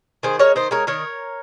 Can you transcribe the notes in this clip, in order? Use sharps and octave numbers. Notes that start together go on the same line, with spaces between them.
D#3 G#4 C5
G#3 A#4 C#5
D#3 C5 D#5
G#3 A#4 C#5
D#3 A#4 C#5